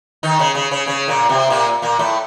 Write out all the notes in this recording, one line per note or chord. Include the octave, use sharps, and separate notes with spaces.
D#3 D#4
C#3 C#4
C#3 C#4
C#3 C#4
C#3 C#4
A#2 A#3
C3 C4
A#2 A#3
A#2 A#3
A2 A3